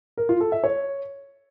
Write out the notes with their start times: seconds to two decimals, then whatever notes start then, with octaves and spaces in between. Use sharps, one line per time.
0.17 A#4
0.29 F4
0.41 A4
0.52 E5
0.64 C#5